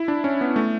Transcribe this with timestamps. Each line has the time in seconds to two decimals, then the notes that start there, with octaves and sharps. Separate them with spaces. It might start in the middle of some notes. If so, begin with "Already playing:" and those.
Already playing: E4
0.08 D4
0.24 C#4
0.41 B3
0.56 A3